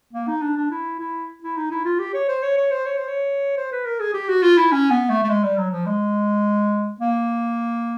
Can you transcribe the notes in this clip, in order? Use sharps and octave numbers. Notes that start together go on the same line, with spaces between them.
A#3
D#4
D4
D4
E4
E4
E4
D#4
E4
F4
G4
C#5
C5
C#5
C#5
C5
C#5
C5
C#5
C5
B4
A#4
G#4
G4
F#4
F4
E4
C#4
B3
A3
A3
G#3
G3
F#3
F3
G#3
A#3